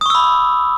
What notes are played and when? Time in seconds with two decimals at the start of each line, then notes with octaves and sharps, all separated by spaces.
0.01 D#6
0.06 C#6
0.10 E6
0.15 B5